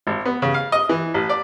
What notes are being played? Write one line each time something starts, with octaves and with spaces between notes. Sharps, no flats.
G#1
B3
C#3
F5
D#5
E3
A1
D5